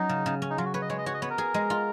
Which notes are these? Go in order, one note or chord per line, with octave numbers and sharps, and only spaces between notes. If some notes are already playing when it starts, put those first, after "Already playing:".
Already playing: F#3 C#4 D#4
C#3
C#3
C#4
D#4
F#3 F4
F#4
B4 C#5
D#5
G#3 C#5
D#5
F#4 C#5
D#5
B3 C#5
A#4
G#4
G#3
F4